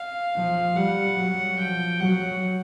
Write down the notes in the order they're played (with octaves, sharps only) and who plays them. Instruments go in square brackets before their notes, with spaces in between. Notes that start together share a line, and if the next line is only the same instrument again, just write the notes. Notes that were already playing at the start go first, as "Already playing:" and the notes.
Already playing: [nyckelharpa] F5
[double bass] F3
[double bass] G3 [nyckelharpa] F#5
[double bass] F#3
[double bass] F3 [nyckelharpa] G5
[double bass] F#3 [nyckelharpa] F#5